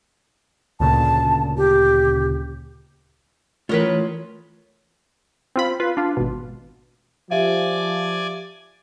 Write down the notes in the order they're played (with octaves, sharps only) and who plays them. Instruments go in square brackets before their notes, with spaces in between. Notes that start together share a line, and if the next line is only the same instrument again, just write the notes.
[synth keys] D2 A#2 C#3 [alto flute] A5
[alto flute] G4
[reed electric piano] E3 A3 [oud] C#4 A#4 B4 [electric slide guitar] F4 C#5
[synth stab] C4 F4 B5
F4 B4
D4 F4
G#1 B2
[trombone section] F3 [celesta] G4 E5 F5 [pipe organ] D5 G#5